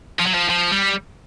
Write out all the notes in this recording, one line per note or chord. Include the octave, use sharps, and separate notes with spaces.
F3
F#3
F3
F3
G3